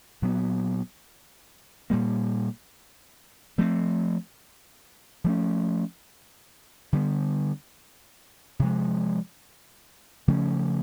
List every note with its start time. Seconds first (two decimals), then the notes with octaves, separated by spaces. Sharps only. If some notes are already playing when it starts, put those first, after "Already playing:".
0.22 A#2 F#3 B3
1.90 A#2 G3 A#3
3.58 F3 A3 C4
5.24 F3 A3 C#4
6.93 D3 G3 B3
8.59 C3 F3 G#3
10.28 C#3 F3 A3 C#4